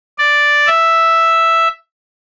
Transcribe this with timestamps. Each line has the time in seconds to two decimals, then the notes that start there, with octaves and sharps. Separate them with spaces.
0.18 D5
0.67 E5